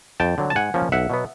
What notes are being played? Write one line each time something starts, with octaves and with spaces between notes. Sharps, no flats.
F2 G5 A5
D3 F#3
A5
G#2 F#5 G#5
F3 A#3 C#4
B1 E5 F#5
B2 F#3 B3